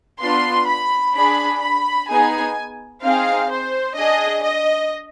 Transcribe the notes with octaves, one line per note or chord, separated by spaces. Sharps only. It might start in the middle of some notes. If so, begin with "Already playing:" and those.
B3 D4 F4 C6
B5
D4 G#4 B5
B5
B3 D#4 G#4 G#5
C4 D#4 G#4 F5
C5
D4 G#4 D#5
D#5